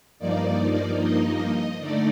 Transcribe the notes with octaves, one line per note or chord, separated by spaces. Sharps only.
G2 F3 A#3 D#4 D5
D#5
D3 A3 D#4 D5